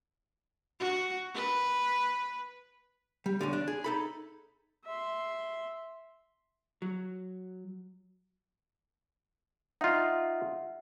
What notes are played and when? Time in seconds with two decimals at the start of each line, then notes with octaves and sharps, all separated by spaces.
0.80 F#4
1.35 B4
3.26 G3
3.41 B1 E2 D3
3.53 D4
3.68 G#4
3.84 D#4 A4 B5
4.85 E5 C6
6.82 F#3
9.81 D#4 F4 E5 F#5